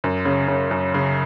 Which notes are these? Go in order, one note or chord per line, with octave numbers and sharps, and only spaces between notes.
F#2
C#3
C#3
F#2
C#3